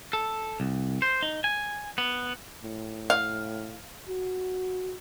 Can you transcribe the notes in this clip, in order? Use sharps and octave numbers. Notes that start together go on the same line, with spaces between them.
A4
C2
C5
D#4
G#5
B3
A2
F5
F#4